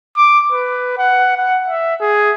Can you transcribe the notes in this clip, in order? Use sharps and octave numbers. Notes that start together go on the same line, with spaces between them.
D6
B4
F#5
F#5
E5
G#4